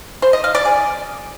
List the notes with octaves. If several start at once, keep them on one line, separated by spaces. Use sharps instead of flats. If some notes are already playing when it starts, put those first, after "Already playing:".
C5
D#5
F5
D5
G#4